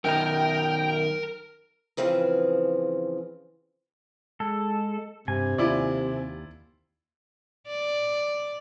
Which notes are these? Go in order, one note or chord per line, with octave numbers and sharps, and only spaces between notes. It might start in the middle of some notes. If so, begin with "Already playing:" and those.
F#2 D#3 A#4 G5 A#5
C#3 E3 F3 C4 G#4
G#3 A4
G2 C3 G#5
D#2 E4 F4 D5
D5